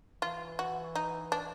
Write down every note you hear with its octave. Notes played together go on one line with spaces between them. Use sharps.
E3 F4
F#4
D#4
D4